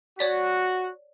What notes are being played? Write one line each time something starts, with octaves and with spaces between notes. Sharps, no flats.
F#4 C#5 D5 B6